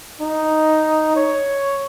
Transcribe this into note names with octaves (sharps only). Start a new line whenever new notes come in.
D#4
C#5